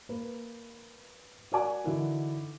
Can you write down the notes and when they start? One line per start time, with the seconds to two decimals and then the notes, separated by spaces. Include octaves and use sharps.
0.09 A#3 B4
1.52 F#4 A#4 D5 F#5 G#5 D6
1.84 D3 E3 D#4 E4 F#4 A#4